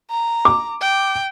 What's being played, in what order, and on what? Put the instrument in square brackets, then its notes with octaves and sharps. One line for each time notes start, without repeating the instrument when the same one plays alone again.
[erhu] A#5
[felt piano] D6
[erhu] G5